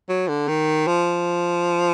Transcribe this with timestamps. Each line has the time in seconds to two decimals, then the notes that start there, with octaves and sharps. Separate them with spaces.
0.09 F#3
0.28 D3
0.48 D#3
0.87 F3